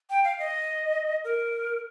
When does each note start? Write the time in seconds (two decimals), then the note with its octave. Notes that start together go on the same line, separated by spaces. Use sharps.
0.10 G5
0.24 F5
0.39 D#5
1.24 A#4